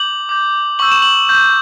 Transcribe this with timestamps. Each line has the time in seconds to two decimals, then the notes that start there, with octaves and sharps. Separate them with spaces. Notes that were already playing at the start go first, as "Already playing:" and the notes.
Already playing: D6 G6 F#7
0.29 D6 G6
0.79 C#6 E6 G6 F#7
0.91 E7
1.02 F#7
1.29 C#6 G6